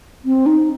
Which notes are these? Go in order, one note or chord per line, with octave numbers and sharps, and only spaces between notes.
C4
D#4